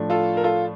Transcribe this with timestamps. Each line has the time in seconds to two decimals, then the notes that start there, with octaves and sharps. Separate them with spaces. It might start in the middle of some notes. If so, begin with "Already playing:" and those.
Already playing: A2 F3 A3 D4
0.10 F4 A4
0.37 A#4
0.44 F4 A4